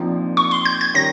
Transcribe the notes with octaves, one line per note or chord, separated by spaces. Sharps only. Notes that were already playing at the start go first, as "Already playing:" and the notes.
Already playing: A#1 A#2 F3 C4 D#4
C#6
C6
G6
G#6
D#3 G3 C#4 A#6